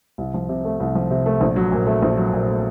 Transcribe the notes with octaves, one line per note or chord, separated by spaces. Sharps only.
C2
F3
C3
A3
C2
F3
C3
A3
A#1
F#3
A#2
A3
A#1
F#3
A#2
A3